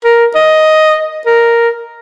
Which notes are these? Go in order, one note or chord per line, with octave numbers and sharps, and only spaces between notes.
A#4
D#5
A#4